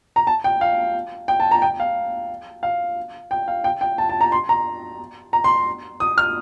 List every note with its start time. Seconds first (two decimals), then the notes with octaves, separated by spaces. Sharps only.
0.16 A#5
0.27 A5
0.44 G5
0.61 F5
1.28 G5
1.40 A5
1.51 A#5
1.62 G5
1.80 F5
2.63 F5
3.31 G5
3.48 F5
3.64 G5
3.81 G5
3.98 A5
4.09 A5
4.21 A#5
4.32 C6
4.49 A#5
5.33 A#5
5.44 C6
6.00 D#6
6.18 F6